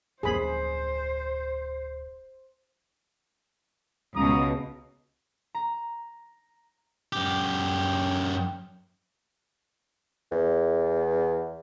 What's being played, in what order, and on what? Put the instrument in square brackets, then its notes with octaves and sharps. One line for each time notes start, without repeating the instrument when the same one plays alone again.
[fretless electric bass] D1 F2 A#3 [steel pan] G#4 B5 [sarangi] C5
[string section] C#2 B2 [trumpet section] A#5 D#6
[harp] A#5
[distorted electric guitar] F#2 G4
[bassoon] E2